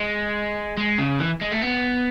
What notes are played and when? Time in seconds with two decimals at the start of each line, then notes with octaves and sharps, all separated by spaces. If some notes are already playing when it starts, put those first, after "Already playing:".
Already playing: G#3
0.77 G#3
0.98 C#3
1.19 E3
1.41 G#3
1.52 A3
1.62 B3